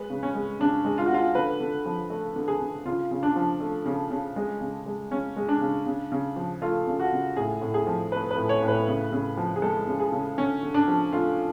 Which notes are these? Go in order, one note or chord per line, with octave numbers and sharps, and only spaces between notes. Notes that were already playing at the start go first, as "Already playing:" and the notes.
Already playing: G#3 B4
C#3
C#4
G#3
C#3 D4
G#3
F4
F#4
C#3 F4
D3 B4
D3
F3
A3
D3
G#4
D3
C#3 F4
C#3
D4
F3
A3
C#3
C#3
G#3
C#3
G#3
C#3 C#4
G#3
D4
C#3
C#3
C#3
F3
A3 F4
C#3
F#4
C#3
A2 G#4
A2
G#4
F3
A3 B4
B4
A2
C#5
A2
B4
C#3
C#3
F3
G#4
G#3 A4
C#3
G#4
C#3
D3 C#4
D3
D4
F3
A3 F4